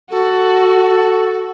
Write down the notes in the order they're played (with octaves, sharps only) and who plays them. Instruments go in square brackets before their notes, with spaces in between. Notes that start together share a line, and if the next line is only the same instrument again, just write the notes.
[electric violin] F#4 [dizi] A4